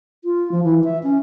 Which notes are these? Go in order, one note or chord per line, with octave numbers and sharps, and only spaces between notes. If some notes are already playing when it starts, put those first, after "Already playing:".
F4
F3
E3
E5
C#4